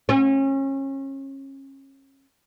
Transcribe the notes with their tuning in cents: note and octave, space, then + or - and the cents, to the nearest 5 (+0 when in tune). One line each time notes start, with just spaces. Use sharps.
C#4 -30